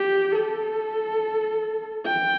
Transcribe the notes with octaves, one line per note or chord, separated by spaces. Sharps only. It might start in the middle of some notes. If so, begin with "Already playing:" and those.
Already playing: G4
A4
G5